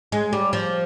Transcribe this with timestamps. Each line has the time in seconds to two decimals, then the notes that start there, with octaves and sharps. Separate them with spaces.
0.12 G#3
0.33 G3
0.53 F3